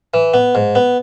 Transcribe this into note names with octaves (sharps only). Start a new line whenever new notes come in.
E3
B3
G#2
B3